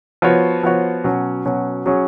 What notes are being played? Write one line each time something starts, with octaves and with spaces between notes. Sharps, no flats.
F3 B3 F#4 C#5
F3 B3 F#4 C#5
B2 F#3 C#4
B2 F#3 C#4
F#3 C#4 G#4